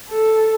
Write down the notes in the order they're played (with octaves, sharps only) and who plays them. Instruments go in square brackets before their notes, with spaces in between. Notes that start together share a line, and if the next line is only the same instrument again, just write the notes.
[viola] A4